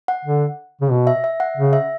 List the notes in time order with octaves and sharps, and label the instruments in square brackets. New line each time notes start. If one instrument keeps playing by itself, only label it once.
[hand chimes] F#5
[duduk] D3
C#3
B2
[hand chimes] E5
E5
F#5
[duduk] C#3
[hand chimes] E5